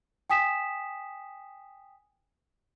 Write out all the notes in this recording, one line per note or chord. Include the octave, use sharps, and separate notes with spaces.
G5 G#5 D#6 B6 E7